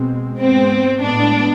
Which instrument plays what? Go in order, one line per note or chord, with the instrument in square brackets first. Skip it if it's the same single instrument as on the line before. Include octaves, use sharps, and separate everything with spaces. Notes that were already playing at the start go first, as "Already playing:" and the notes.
Already playing: [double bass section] B2 G#3 C4
[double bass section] G#2 G#3 B3 [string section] C4
[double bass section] A2 G#3 B3 [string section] D4